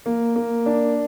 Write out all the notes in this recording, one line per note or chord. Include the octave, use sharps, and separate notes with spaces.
A#3
A#3
D4